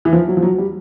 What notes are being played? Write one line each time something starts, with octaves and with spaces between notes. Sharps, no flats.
E3
F3
F#3
F3
F#3
G3